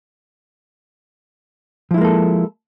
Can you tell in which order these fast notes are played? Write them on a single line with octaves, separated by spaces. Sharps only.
F3 E4 G#3 A#3 A4